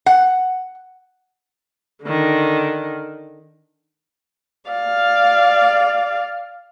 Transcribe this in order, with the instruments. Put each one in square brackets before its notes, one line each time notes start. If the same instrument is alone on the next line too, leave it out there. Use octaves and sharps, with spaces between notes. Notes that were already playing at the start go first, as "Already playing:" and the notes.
[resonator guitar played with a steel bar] F#5
[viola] D3 D#3
D5 F5